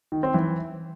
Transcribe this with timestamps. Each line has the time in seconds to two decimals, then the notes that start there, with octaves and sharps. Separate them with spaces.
0.12 D#3
0.23 C4
0.34 E3